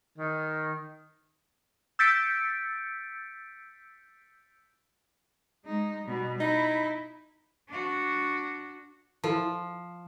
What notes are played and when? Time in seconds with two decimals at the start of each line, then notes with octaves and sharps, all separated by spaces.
0.18 D#3
1.99 E6 G6 A6 B6 C#7 D7
5.65 G#3 D#4
6.04 B2 G3
6.40 D#4 E4
7.69 D4 F#4
9.24 F3 E4 A4 A5